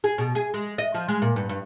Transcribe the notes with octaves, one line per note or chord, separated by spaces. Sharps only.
G#4
B2
G#4
G#3
D#5
F3
G#3
A#2
G2
G2